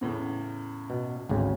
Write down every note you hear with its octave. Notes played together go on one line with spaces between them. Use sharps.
E2 A2 C#3
B2
G#1 D2 C#3